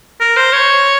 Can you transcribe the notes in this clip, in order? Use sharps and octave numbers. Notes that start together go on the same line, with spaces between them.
A#4
C5
C#5